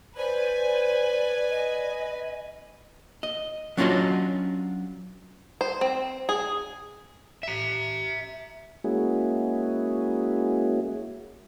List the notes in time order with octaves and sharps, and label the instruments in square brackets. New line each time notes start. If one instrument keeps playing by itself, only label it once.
[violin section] B4 G#5 [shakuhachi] C5 [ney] D5
[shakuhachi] D#5
[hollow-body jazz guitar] D#5
F#3 C#4 D4 F4 F#4 D#5
[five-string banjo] C5
C4
G#4
[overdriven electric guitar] E5 A#5
[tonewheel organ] G#3 A#3 C#4 E4 F#4 G#4